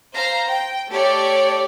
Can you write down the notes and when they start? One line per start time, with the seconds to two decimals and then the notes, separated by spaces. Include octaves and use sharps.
0.13 C5 F5 A#5
0.48 G5
0.90 A3 G4 C#5 D5